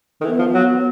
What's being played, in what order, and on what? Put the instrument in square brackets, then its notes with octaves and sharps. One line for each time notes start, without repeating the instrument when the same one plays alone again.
[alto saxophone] D#3
[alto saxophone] E3 [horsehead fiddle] B3
[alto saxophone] F3
F#3